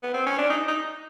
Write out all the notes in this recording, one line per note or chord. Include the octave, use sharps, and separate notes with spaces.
B3
C4
C#4
D4
D#4
D#4